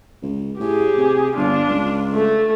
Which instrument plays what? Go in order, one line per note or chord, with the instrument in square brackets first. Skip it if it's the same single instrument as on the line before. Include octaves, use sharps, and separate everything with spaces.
[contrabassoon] C#2
[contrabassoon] A2 [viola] G4 G#4
[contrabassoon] C3
[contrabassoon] G1 [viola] D4 F4
[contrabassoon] C#2
[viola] A3